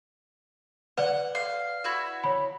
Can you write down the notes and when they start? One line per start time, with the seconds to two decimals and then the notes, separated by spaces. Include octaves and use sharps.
0.97 B4 D5 F#5
1.35 F5
1.84 E4 F#4 E5
2.24 C#5 B5